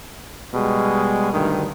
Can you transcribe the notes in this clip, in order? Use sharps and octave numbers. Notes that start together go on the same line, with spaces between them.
B2 G3 G#3
D2 G2 D#3